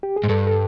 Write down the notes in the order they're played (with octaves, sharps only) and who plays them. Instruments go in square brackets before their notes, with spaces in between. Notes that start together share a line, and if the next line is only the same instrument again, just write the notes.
[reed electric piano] G4
G#4
[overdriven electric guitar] G#2
[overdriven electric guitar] G2 [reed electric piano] A4
[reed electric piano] A4